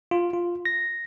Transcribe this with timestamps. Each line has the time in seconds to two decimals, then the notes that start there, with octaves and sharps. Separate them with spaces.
0.11 F4
0.33 F4
0.65 A#6